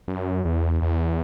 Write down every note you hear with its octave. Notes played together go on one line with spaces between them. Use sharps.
F#2
E2
E2